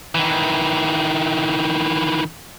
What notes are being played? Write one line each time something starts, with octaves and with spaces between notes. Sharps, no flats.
D#3 E3